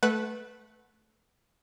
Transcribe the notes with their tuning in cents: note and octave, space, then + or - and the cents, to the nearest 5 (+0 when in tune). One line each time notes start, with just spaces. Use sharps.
A3 -15 B4 +0 F#5 +0